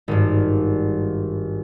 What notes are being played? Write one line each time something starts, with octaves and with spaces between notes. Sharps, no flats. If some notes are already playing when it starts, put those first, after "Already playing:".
G#1 G2